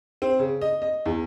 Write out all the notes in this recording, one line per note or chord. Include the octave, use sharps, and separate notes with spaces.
C4
C#3
D#5
D#5
E2